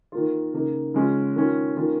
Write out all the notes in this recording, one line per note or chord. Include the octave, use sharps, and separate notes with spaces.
D#3 A#3 F4
C#3 A#3 D#4
C#3 G#3 C#4 F4
D#3 C#4 F4
D#3 A#3 C#4 F4